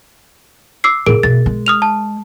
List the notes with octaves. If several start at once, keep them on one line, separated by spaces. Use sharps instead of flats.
D6 E6 C7
A2 C#3 G#4 A#4 D7
B2 A3 A6
G#3
D#6 F6 F7
A5